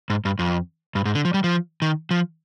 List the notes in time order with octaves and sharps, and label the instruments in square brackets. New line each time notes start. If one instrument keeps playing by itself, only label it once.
[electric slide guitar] G#2
G2
F2
G2
G#2
D3
F3
G3
F3
D#3
F3